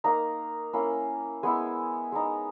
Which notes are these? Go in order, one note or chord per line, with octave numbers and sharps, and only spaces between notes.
A#3 D#4 A#5
A#3 C#4 E4
G#3 B3 E4 G#5
G#3 B3 D#4